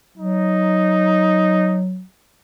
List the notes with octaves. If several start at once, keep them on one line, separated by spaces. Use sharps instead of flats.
F#3 D#4